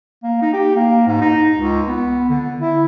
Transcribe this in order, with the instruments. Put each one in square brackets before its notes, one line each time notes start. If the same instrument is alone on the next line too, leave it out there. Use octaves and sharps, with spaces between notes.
[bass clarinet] A#3
D#4
G4
A#3
G#2
D#4
C#2
B3
D3
E4